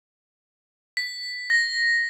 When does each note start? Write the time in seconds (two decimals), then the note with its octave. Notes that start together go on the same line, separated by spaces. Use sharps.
0.97 B6
1.50 A#6